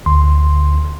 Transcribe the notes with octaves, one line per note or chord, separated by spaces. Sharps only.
D2 D3 C6